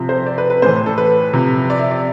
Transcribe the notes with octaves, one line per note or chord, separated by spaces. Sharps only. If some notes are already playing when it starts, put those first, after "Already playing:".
Already playing: C3 F3
C5
D5
B4
B4
A2 E3 C5
A4
B4
C3 F3
D5
E5
D5